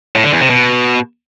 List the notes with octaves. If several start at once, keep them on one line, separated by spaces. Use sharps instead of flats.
A2
D3
E2
C3
B2